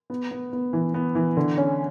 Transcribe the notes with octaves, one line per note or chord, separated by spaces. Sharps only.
B3
B3
B3
E3
B3
E3
D3
C#4